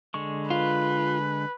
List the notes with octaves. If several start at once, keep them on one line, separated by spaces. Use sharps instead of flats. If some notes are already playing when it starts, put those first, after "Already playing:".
D3 G#3 C#6
F4 B4